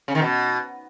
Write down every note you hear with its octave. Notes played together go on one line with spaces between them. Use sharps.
C#3
D#3
B2